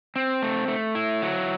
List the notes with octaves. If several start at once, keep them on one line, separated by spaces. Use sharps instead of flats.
C4
A3
A3
E4
F#3